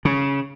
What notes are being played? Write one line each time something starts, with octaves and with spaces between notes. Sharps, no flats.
C#3